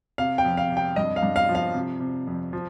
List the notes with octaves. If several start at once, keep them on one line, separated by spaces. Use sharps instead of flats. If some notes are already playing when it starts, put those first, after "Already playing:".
C3 F5
G5
F2
F5
C3
G5
G2 D#5
F5
G2
F5
F3
F5
C3
C3
F2
F3